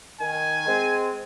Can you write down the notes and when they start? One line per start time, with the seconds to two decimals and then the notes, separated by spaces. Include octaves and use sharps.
0.21 D#3 G#5
0.67 G#3 C4